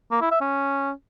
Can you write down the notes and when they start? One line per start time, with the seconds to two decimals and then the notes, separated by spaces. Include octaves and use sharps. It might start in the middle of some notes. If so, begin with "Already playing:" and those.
0.11 A#3
0.21 E4
0.31 E5
0.41 C#4